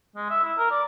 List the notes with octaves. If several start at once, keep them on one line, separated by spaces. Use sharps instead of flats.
G#3
E5
E4
A#4
D5